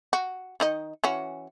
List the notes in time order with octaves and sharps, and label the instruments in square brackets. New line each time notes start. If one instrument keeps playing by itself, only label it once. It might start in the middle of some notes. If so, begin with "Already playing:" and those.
[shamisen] F#4
D#3 D#4 D#5
E3 C#4 F#4